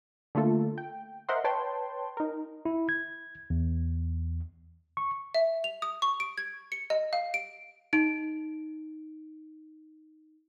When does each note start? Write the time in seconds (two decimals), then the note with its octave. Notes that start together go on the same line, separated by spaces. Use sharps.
0.35 D3 A3 A#3 F4 A4
0.78 G5
1.29 A#4 C5 D#5 E5 F#5 C6
1.44 B4 C#5 G5 A5 C6
2.17 D#4 A#4
2.65 E4
2.89 G#6
3.50 E2
4.97 C#6
5.35 E5
5.64 F7
5.82 D#6
6.02 C#6
6.20 D7
6.38 G#6
6.72 C#7
6.90 D#5
7.13 F5
7.34 D7
7.93 D#4 D7